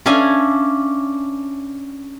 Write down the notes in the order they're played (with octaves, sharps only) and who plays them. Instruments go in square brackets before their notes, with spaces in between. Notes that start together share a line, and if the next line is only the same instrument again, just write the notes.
[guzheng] C#4 D4 E5 F5 G#5